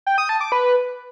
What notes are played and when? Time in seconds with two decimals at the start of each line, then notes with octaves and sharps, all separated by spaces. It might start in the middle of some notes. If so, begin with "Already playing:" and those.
0.06 G5
0.18 D#6
0.29 A5
0.41 D6
0.52 B4